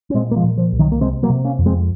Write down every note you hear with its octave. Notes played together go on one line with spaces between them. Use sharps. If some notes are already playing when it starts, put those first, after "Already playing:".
C#4
A#2 G#3 C4
A#3
F3 G#3
A#2
F3
C2
D#3 F#3
A#3
C3 G#3 C4
F#3 A#3
C3
A#3 C#4
F2
G#3 C4